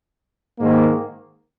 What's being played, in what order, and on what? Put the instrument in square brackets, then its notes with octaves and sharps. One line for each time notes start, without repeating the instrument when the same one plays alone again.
[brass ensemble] G#2 D#3 A#3